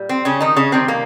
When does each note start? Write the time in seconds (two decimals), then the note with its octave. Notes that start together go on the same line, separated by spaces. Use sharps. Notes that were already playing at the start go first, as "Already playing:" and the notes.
Already playing: A#2 G3
0.09 C4
0.25 C#3 C#4
0.40 D#3 D#4
0.56 C#3 C#4
0.72 C3 D#3 G3 C4
0.88 A#3